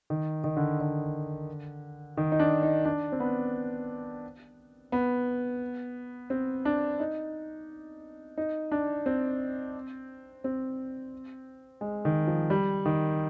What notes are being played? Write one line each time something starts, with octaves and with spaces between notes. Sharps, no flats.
D#3
D#3
D3
D3
D#3
D#4
D4
D#4
D4
C4
B3
B3
C4
D4
D#4
D#4
D4
C4
C4
G#3
D#3
F3
G3
D#3